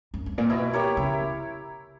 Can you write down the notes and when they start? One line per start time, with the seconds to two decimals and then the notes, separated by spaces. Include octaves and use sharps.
0.14 F#2
0.26 G2
0.38 A#2
0.50 B2 E4
0.74 G4 A#4 C#5
0.97 C#3 E4